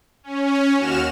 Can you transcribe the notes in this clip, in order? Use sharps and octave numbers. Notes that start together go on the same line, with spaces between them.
C#4
D#2 F#4 F6 E7